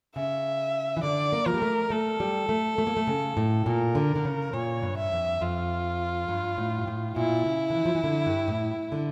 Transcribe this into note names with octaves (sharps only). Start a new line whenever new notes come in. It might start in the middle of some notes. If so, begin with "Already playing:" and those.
C#3 E5
E3
D3 D5
A#3
F3 A#4
G3
A3
A3 A4
G3
A3
A3
A#3
A3
C#3
A2
A#2 A#4
D3
D3
C#3
A#2 C#5
G2
E5
F2
F2 F4
G2
A2
G2
A2
A#2 E4
C#3
D3
E3
F3
E3
D3
G2
A2
D3